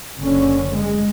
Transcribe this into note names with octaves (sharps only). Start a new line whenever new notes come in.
F#1 D3 C#4
G#3